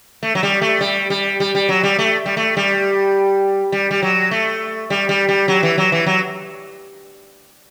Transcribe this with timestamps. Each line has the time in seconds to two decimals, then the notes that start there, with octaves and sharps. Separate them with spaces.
0.23 A3
0.35 F#3
0.43 G3
0.62 A3
0.81 G3
1.10 G3
1.40 G3
1.55 G3
1.69 F#3
1.83 G3
1.99 A3
2.26 G3
2.37 A3
2.57 G3
3.72 G3
3.91 G3
4.03 F#3
4.31 A3
4.90 G3
5.09 G3
5.29 G3
5.48 F#3
5.63 E3
5.78 F#3
5.92 E3
6.06 F#3